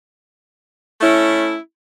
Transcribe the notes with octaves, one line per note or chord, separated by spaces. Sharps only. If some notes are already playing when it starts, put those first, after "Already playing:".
A3 C#4 E4